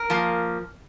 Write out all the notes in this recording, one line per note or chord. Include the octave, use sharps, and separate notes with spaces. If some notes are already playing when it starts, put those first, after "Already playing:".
Already playing: A#4
F3 A#3